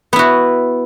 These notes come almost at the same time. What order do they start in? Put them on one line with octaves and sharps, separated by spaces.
B3 E4 F#4